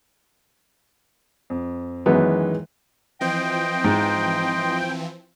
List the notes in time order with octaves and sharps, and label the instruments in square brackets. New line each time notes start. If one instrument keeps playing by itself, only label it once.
[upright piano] F2
[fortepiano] F#2 B3 [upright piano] D#3 E3 G#3
[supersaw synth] E3 F3 C4 [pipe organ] D#5 C6 [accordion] G5
[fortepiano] G#2